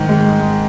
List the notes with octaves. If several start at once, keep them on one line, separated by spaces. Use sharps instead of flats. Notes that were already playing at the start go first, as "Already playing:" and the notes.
Already playing: G#2 D#3
G#3